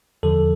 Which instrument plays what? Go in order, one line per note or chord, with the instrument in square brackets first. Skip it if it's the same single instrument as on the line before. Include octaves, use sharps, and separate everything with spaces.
[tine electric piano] E2 D3 F3 A4